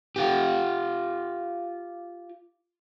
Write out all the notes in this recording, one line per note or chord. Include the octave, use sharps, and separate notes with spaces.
F4 G4